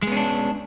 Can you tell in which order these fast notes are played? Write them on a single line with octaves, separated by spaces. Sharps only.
G#3 B3 C#4 D4